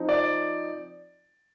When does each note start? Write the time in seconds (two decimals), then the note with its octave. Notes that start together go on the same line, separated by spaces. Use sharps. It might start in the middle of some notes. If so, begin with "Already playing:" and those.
Already playing: F3 C4 D#4
0.09 D5